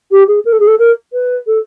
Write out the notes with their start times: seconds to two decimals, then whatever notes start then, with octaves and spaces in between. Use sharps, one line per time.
0.11 G4
0.27 G#4
0.45 A#4
0.52 A4
0.59 G#4
0.67 A4
0.79 A#4
1.12 B4
1.46 A4